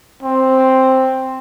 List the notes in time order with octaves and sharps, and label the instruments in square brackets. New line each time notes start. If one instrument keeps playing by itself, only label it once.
[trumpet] C4